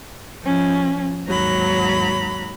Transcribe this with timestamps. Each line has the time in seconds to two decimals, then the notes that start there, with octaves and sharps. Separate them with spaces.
0.41 F3 C#4
1.27 D#2 G#2 F#3 A#5 B5